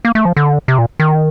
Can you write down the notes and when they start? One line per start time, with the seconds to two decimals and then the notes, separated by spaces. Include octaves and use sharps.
0.05 A#3
0.15 A3
0.25 F3
0.37 D3
0.68 C3
0.78 A#2
1.00 D#3